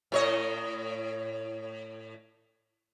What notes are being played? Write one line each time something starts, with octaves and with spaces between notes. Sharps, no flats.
A2 C#5 D#5